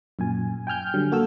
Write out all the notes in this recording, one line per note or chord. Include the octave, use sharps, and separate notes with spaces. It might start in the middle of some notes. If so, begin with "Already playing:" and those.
F#2 A#2 G#5
G5 G#5 F6 G6
D3 F#3 G3
A#3 F#4 A4 E6